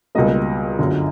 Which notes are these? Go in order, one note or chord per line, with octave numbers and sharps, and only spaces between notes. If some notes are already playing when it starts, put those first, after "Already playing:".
C#2 B2 G3 A#3 D#5
G1 F#2 D3